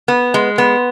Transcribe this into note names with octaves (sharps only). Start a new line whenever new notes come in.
B3
G#3
B3